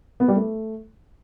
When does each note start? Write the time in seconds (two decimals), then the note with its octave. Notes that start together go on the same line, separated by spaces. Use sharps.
0.20 B3
0.28 G3
0.36 A3